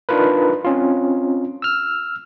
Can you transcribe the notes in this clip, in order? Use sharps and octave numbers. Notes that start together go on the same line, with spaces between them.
D4 D#4 F4 A#4 B4
C4 C#4 F4
E6 F6